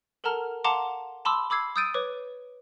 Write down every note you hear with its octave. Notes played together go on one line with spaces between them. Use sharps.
A4 A#4 F#5 A5 A#5 F6
F5 F#5 A5 A#5 C6 D6
A5 B5 C6 D6 E6
B5 D6 E6 G#6 C7
D#6 E6 G6 A6 D7 D#7
B4 C#5 D6